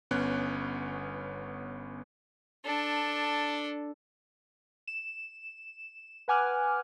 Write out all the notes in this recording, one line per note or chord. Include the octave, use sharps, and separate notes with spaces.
G1 B3 C#4 F#6
D4 A4
E7
B4 F#5 G#5 D6 F6 F#6